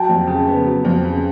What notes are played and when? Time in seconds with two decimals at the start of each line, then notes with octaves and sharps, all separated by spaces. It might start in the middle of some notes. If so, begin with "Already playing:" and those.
Already playing: F#3 G5 A5
0.09 F2
0.27 C#3
0.47 B3
0.65 F#3
0.85 F2
1.04 C#3